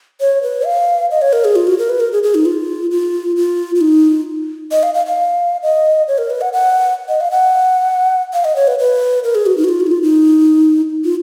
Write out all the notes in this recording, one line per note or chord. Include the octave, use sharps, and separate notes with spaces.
C#5
B4
F5
D#5
C#5
A#4
G#4
F4
F#4
A#4
B4
A#4
G#4
G#4
D#4
F4
F4
F4
F4
D#4
D#5
F5
F5
F5
D#5
C#5
A#4
B4
F#5
F#5
D#5
F5
F#5
F5
D#5
C#5
B4
B4
A#4
G#4
F#4
D#4
F#4
F4
F#4
D#4
F4
D#4
F4